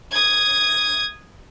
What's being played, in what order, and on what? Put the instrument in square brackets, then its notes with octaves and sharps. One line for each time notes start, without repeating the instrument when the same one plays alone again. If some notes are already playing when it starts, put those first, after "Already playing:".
[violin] D#6 G#6